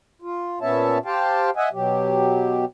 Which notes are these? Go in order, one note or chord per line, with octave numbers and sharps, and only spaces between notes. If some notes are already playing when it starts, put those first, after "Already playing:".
F4
A#2 B3 C#4 C#5 E5 A5
G4 C5 F5 G5 A5
D#5 E5 F#5 G#5
B2 F#3 G4